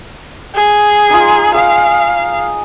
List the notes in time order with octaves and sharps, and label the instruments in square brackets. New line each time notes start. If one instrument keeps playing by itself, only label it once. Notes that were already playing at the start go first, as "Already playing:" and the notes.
[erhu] G#4
[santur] D#4 F4
[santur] G#4 F#5 [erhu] F5